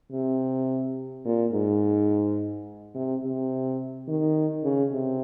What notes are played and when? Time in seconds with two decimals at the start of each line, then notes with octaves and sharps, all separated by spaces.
0.12 C3
1.25 A#2
1.53 G#2
2.95 C3
3.24 C3
4.07 D#3
4.64 C#3
4.92 C3